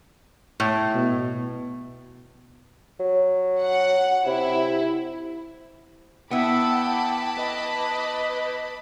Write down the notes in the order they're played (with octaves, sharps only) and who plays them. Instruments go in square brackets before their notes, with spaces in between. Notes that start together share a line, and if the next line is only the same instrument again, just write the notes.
[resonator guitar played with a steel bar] A2
[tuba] B2
[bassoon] F#3
[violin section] F#5
[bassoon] C3 [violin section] E4
[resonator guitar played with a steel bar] B3 E4 [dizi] F#5 [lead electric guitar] G5 [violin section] A5 B5 D6
[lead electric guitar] B4 [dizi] D#5